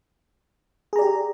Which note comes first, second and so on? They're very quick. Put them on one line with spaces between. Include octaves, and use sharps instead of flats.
G#4 A#5 D5 G4